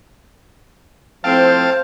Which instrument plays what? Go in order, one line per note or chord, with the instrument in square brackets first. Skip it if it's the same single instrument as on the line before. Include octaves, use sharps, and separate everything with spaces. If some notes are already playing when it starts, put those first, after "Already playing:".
[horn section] A2 F3 C4 [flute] C5 [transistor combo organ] F5 A5